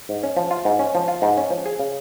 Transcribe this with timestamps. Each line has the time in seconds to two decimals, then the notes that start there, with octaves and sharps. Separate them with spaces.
0.09 G#2
0.23 C#4
0.37 F3
0.51 F4
0.65 G#2
0.79 C#4
0.95 F3
1.08 F4
1.22 G#2
1.37 C#4
1.51 F3
1.66 G#4
1.79 C#3